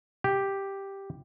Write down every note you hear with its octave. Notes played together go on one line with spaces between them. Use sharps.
G4